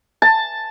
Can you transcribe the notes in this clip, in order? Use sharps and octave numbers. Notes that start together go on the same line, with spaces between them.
A5